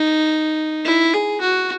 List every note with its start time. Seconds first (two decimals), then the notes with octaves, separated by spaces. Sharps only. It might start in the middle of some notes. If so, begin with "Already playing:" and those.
Already playing: D#4
0.85 E4
1.13 G#4
1.41 F#4